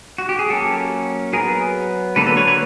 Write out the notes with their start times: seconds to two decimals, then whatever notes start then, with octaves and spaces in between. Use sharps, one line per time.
0.18 F#4
0.29 G4
0.39 G#4
0.50 F#3 A#3 C#4 G4 A4
1.33 F#3 B3 G#4 A#4
2.16 D3 F#3 A#3 A4 B4
2.26 A4 B4
2.37 B4 C#5
2.48 B4 C#5